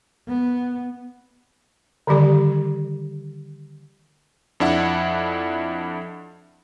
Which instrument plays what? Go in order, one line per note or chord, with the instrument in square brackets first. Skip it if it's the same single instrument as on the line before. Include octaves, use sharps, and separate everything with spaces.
[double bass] B3
[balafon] D3 D#3 G3 G4 D5
[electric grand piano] F2 D4 E4 F#5